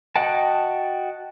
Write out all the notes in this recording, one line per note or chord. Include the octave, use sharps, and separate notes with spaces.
F#4 D#5 F#5 G5 A5